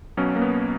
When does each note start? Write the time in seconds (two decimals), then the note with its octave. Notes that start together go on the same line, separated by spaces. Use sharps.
0.17 B1 B2 F#3 C#4
0.36 A#3
0.42 B3